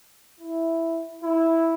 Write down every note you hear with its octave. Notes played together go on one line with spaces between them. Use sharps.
E4
E4